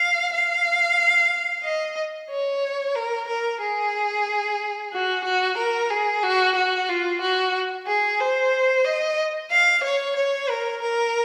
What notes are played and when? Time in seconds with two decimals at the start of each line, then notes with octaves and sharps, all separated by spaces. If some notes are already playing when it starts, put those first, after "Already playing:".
Already playing: F5
0.33 F5
1.64 D#5
2.30 C#5
2.95 A#4
3.28 A#4
3.61 G#4
4.93 F#4
5.25 F#4
5.58 A#4
5.90 G#4
6.23 F#4
6.55 F#4
6.89 F4
7.21 F#4
7.87 G#4
8.20 C5
8.85 D#5
9.51 F5
9.83 C#5
10.16 C#5
10.49 A#4
10.82 A#4